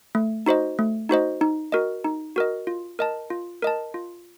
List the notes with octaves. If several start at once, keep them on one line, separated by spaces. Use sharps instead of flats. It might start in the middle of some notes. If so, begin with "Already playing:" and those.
A3
D#4 F#4 C5 D#5
A3
D#4 F#4 C5 D#5
D#4
F#4 A#4 D#5
D#4
F#4 A#4 D#5
F4
A#4 D#5 A5
F4
A#4 D#5 A5
F4